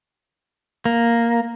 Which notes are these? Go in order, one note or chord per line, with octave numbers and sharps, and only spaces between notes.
A#3